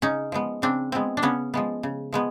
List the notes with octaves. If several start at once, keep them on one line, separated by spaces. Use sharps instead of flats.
C#3 C#4 D#4
F3 G#3 B3
C#3 C4 D4
F3 G#3 B3 C4
D4
C#3 B3 C#4
F3 G#3 B3
C#3
F3 G#3 B3